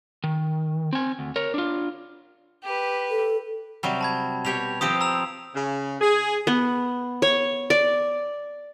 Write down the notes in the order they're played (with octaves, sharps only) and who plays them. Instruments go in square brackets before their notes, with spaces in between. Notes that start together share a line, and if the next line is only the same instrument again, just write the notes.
[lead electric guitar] D#3
C4 G#5
D2
A#4 C#5
D4 F4
[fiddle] G4 B4
[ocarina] A4
[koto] C3 F#3 G3
[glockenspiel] A5 B5 G#6
[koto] B2 G4 C#5 [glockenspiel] F7
[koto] F3 C4 G4 [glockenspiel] D#6 D7
[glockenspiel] A#5 E6 F7
[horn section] C#3
G#4
[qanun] B3
C#5
D5